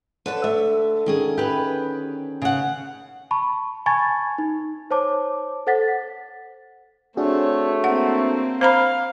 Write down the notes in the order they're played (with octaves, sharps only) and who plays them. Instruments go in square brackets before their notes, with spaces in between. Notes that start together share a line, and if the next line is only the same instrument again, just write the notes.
[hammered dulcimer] D3 [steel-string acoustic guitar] B4 C#5 A5
[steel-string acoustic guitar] A3 [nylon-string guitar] E5
[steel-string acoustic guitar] D#3 C#4 G#4
[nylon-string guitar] G4 B4 [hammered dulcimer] G5
[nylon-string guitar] C#3 F#5
[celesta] A5 B5 C#6
G#5 A5 B5 C#6 G#6 A6
D#4
C5 C#5 A5 D6
A4 C5 F#5 A6 B6
[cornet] A3 [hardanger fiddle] C4 C#5 [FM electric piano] D4 F#4 G#4
[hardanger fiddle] A#3 C4 [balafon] F#5
[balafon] C5 A#5 B5 [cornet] F5